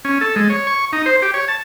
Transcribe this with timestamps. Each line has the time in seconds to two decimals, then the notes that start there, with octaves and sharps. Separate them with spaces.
0.05 C#4
0.21 A4
0.36 G#3
0.50 C#5
0.67 C#6
0.93 D#4
1.06 C5
1.22 G4
1.34 C#5
1.48 A5